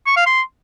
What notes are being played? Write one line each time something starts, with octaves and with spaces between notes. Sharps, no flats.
C#6
F5
C6